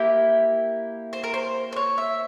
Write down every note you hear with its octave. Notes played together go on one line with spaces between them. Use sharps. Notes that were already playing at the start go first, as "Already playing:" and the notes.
Already playing: A#3 E4 G4
C5
A#4
C5
C5
C#5
E5